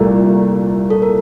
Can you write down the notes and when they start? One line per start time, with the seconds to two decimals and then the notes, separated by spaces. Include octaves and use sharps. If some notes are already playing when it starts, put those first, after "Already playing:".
Already playing: C2 A#2 A3 A#4 D5
0.90 A4
1.02 A#4